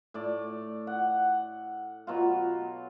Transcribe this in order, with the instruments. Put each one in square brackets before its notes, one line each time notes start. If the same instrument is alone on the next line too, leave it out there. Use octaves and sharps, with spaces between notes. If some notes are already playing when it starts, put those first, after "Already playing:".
[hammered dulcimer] A2 D5
F#5
B2 F#3 F4